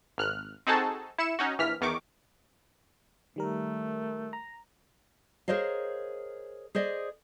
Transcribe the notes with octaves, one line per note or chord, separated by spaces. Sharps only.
G#1 F6 F#6
C4 D#4 F#4 G#4 A4 A5
E4 C#7 E7
C#4 D#4 F#4
A#1 E3 F6 B6
E2 D#3 C#6 D6
D#3 G3 A3 A#4
A#5
G#4 A#4 C5 C#5 D#5 F5
G#4 C5 D5 D#5